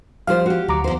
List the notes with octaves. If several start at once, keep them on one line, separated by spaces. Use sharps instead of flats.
F3 G3 G4 C5 F5
F#4 G4
D2 F#3 A#5 D6
E2 C5